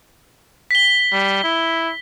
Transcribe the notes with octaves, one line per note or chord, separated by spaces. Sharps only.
B6 G7
G3
E4